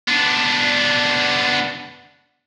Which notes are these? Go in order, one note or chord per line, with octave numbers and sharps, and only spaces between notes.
B3 D4